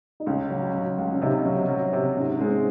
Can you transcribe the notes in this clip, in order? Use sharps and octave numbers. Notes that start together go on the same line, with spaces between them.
D#4
C#2 C#4
F#3
F#3
C#2
C#4
C3 D#4
F#3
F#3
C3
G#2 C#4
G#3 C#4
C4